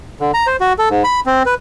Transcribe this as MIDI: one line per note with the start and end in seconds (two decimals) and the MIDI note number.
0.20 0.31 50
0.34 0.47 82
0.47 0.56 72
0.60 0.73 66
0.79 0.89 69
0.90 1.03 44
1.04 1.20 83
1.26 1.43 60
1.46 1.54 71